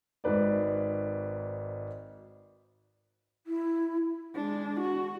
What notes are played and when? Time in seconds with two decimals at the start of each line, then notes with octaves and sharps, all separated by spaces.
0.24 G#1 G#2 B4 D5
3.47 E4
4.35 G#3 D4
4.80 F#4